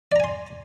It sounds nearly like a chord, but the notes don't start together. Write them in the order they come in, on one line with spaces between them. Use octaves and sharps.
D5 A#5 G#5 C6